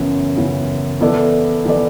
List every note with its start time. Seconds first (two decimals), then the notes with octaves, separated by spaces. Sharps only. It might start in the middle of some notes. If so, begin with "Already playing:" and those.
Already playing: F#2 C#3 E3 B3 E4
0.36 F#2 C#3 E3 B3 E4
1.00 E3 B3 E4 A4 D5
1.65 E3 B3 E4 A4 D5